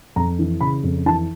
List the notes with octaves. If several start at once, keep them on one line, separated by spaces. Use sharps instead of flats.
F2 A#5
E3
C#3 B5
F2
E3 A5